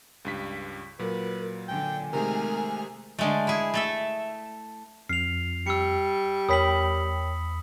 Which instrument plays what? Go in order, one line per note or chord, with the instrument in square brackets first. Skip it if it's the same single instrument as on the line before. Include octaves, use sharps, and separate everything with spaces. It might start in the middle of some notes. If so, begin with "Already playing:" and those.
[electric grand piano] C#2 G2 B6
[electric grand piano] A#2 F#3 [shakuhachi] A#4 [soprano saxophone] B4
[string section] D3 [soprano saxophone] G5 [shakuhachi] G#5
[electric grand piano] C3 D#3 G#3 [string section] A3 G#4 F6 [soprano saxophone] A#4
[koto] D3 G#3 A3
E4 G#4
A3 A4 E5
[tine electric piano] F2 [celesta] F6 [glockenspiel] C7 F7
[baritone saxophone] G3 [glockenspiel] E6 C#7
[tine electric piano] E2 B5 [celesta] A#4 C#5 G5 [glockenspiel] D#6 B6 F#7